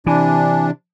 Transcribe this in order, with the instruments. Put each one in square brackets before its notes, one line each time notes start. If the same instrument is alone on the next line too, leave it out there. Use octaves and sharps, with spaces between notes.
[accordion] C3 D4 [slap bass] E3 [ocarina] G#5